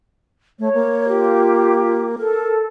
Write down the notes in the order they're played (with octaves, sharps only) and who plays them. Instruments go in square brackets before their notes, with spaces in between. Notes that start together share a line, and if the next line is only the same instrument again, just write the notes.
[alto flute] A3 [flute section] C#5
[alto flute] A#3
[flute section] F4 G4
[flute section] A4 [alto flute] A#4